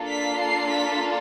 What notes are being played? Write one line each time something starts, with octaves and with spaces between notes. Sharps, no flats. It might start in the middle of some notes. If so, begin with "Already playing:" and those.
Already playing: A#3 D4 F4 A4
B6
C7
B6